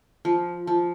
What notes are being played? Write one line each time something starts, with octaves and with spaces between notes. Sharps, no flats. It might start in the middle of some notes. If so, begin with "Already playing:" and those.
F3
F3